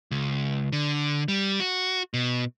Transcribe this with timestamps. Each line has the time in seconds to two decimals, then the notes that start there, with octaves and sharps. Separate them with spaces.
0.11 C#2
0.73 D3
1.28 G3
1.60 F#4
2.14 B2